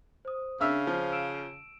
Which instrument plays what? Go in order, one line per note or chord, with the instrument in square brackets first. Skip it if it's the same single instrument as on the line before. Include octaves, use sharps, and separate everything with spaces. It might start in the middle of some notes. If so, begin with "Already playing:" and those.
[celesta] C5 D#6
[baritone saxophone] C#3 [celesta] D4 [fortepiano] E5 E6 F6 [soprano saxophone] F5
[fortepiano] F3 [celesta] C5
[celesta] E6 D7 E7